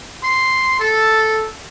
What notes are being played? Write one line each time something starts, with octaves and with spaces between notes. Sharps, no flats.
C6
A4